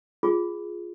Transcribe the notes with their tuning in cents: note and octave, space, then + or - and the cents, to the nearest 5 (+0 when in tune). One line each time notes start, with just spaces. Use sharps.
F4 +0 G#4 +0